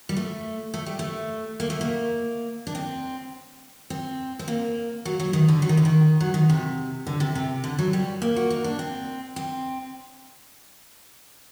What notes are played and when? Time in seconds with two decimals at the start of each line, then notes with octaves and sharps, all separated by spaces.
0.09 G3
0.17 A3
0.74 A3
0.86 G3
0.99 A3
1.60 A#3
1.70 A3
1.81 A#3
2.67 D4
2.75 C4
3.90 C4
4.39 C4
4.48 A#3
5.05 F#3
5.20 F#3
5.33 D#3
5.48 D3
5.62 F#3
5.69 D#3
5.77 D3
5.85 D#3
6.20 F#3
6.34 D#3
6.49 C3
7.07 D3
7.20 C3
7.35 C3
7.64 D3
7.78 F#3
7.93 G3
8.22 A#3
8.36 F#4
8.50 D#4
8.64 D4
8.79 C4
9.36 C4